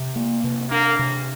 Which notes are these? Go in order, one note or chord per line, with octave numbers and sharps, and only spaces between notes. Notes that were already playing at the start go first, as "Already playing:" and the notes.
Already playing: C3
A#3
C3
A#3 D4
C3